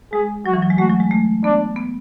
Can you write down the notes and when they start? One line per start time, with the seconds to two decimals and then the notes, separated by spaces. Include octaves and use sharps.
0.13 G#3 G#4
0.46 F#3 F#4
0.54 E3
0.62 F#3
0.70 G#3
0.78 A3 F#4
0.89 F#3
1.00 G#3
1.11 A3
1.44 B3 D4
1.76 B3